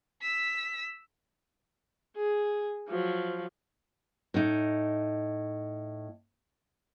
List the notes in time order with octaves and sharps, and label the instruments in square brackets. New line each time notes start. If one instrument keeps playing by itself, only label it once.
[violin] E6 B6
[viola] G#4
F3 F#3
[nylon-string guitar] A2 D#4